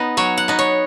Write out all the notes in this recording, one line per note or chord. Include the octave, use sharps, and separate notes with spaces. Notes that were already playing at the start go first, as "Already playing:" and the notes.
Already playing: B3 D#4
F#3 C#5
F#5
B3 D#4
C#5